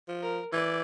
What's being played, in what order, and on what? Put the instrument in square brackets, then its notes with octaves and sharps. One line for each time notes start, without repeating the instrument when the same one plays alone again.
[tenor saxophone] F3
[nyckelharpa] A#4
[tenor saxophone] E3 [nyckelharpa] D5